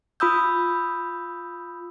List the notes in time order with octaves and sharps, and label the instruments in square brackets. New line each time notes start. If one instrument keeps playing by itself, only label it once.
[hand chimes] F4 B5 D#6 E6 G6